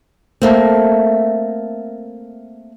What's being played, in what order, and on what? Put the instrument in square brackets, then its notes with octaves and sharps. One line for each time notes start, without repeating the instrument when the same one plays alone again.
[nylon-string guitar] A3 A#3 C4